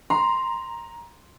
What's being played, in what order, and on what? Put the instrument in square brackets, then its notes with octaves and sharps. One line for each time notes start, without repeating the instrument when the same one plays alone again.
[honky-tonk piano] A#5 [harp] C6